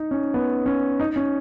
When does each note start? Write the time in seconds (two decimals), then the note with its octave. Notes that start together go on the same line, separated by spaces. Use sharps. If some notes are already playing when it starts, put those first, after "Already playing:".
Already playing: D#4
0.11 C#4
0.34 B3
0.66 C#4
1.00 D#4
1.16 C#4